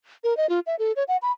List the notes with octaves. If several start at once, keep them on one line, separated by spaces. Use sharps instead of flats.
A#4
D#5
F4
E5
A4
C#5
F#5
B5